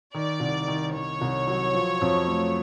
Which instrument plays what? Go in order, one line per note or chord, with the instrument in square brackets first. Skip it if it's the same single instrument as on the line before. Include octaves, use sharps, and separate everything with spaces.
[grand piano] D#3 [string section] D5
[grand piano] C2
D#3
[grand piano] D#3 [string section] C#5
[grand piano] C2
F#3
F3
F2
A3